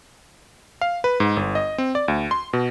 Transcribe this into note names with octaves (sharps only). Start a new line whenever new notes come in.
F5
B4
G#2
G1
D#5
C4
D5
D2
C6
B2